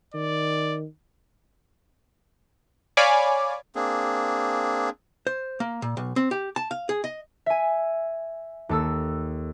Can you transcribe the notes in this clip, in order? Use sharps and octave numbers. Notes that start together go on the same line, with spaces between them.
D#3 D5
C#5 D5 F5 G#5 B5 D6
A#3 C4 D4 G#4
C5
A#3
A#2
B1
C4
G4
A5
F5
G#4
D#5
E5 G#5
D#2 A4 E6